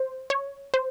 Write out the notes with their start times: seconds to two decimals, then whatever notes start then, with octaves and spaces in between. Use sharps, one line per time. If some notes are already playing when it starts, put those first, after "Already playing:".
Already playing: C5
0.30 C#5
0.74 C5